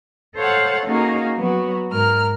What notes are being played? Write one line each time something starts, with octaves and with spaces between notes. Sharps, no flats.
A4 C5 C#5 F5 F#5
A#3 C#4 D#4 F#4 G#4 F5
F#3 B3 F#4
G#2 A#4 F6